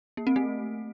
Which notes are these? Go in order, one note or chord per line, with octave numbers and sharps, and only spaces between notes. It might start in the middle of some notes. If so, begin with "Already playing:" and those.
A#3
C4
A3